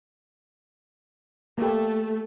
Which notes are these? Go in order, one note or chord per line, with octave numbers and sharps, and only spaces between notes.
A3 A#3 G4